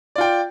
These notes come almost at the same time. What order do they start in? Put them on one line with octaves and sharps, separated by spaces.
D5 F4 G5